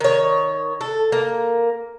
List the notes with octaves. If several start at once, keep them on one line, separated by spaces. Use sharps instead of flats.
D#3 C#5
A4
A#3